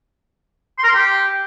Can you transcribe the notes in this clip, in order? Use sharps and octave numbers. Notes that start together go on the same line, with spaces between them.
C6
A#4
C6
G4